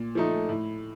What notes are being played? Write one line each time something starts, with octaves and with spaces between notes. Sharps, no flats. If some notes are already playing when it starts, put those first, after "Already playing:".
Already playing: A#2
F3 A3 D#4
A2